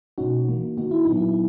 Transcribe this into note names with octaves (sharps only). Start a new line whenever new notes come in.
B2 A#3 C#4 D#4 F#4
E3 A#3 D#4
D#3 A#3 D#4 F#4
E4
A#2 F#3 B3 D#4
E4